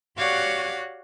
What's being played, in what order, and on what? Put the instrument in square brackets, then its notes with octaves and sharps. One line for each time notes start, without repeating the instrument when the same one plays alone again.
[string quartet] F#4 G4 C#5 D5 F5 F#5